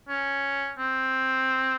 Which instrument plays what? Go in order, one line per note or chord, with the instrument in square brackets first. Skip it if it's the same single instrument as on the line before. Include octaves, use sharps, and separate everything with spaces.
[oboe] C#4
C4